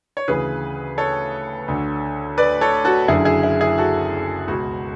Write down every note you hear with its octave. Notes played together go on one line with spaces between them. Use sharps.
C#5
D2 C#3 E3 G#4 B4
A4 C#5
D2 D3
B4 D5
A4 C#5
F#4 A4
F#1 F#2 D3 E4 G#4
E4 G#4
E4
E4 G#4
F#4 A4
C#2 B2 F#4